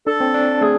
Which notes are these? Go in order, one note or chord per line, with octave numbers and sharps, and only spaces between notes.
D4 A4
C4
D4
A3 G#4